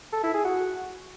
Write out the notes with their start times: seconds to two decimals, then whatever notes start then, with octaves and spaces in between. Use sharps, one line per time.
0.12 A4
0.23 E4
0.34 G#4
0.45 F#4